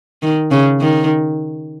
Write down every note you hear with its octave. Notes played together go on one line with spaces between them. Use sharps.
D#3
C#3
D#3